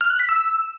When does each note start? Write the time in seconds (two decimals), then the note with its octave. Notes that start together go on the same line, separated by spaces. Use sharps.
0.01 F6
0.10 F#6
0.19 B6
0.29 E6